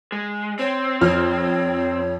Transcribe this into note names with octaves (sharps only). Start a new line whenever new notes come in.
G#3
C4 C#5
F2 C#5 F6